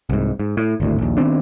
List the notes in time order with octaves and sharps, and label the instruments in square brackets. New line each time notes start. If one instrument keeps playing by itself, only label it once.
[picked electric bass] C2 G#2
G#2
A2
G#1 D2 A2
A#1 D#2
D#3 B3 C4 D4